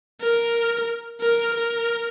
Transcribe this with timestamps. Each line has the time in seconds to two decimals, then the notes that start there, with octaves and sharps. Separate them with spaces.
0.22 A#4
1.22 A#4
1.55 A#4